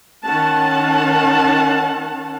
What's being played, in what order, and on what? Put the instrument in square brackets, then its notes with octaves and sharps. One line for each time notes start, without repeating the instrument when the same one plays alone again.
[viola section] D#3 C#4 F#5 A5